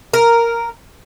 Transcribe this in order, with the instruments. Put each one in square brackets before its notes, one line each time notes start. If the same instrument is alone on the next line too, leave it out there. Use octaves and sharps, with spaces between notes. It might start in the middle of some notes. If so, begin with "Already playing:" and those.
[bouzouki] A#4